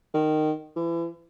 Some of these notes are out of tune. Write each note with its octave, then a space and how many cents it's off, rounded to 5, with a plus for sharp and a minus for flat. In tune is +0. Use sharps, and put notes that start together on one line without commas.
D#3 -15
E3 +35